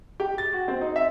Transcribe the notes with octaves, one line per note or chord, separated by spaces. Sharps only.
G4
A6
F#4
C4
D#4
E5